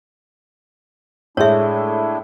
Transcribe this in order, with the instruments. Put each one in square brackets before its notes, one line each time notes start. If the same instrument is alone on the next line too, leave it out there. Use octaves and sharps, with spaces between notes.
[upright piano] A2 G#3 [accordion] A3 D4 E4 [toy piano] C#5 E5